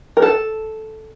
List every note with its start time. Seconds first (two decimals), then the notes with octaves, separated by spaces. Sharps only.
0.17 A#4
0.22 A4